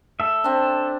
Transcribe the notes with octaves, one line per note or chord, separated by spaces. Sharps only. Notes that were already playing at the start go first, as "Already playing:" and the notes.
A4 E5
C4 D4